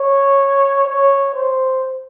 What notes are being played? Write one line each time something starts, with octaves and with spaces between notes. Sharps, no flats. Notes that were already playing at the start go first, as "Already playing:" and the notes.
Already playing: C#5
C#5
C5